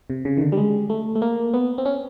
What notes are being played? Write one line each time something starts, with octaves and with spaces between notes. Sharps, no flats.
C3
C#3
D#3
D3
G3
G#3
A3
A3
A#3
B3
C4
C#4